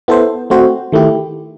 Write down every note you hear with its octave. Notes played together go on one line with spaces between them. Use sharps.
B3 E4 A4 C5
A3 C4 F#4 C5
D#3 A3 E4 G4